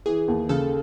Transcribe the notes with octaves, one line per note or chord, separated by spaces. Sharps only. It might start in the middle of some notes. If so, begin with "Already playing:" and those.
E3 G#4
D#2
C#3 A4